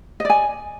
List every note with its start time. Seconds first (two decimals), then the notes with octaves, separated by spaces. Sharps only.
0.20 D#5
0.25 D5
0.30 G#5